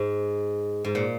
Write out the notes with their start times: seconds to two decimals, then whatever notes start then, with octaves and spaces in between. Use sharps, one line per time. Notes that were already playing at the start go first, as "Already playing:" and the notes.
Already playing: G#2
0.84 G#2
0.95 A#2